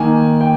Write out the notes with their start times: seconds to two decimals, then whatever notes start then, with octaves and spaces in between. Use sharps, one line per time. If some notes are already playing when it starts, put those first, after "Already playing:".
Already playing: D#3 A#3 G#5
0.41 G5